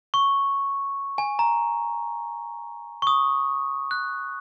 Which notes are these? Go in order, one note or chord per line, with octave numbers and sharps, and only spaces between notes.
C#6
G#5
A#5
C#6
D#6
F#6